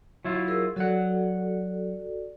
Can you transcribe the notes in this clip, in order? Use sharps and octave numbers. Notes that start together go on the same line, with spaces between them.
F#3 E4 F4
G#4 A#4 E6
F#3 F#4 A4 D5 F#5